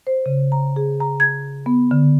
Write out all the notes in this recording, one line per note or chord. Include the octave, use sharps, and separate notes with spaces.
C5
C#3
A#5
G#4
A#5
G#6
B3
D3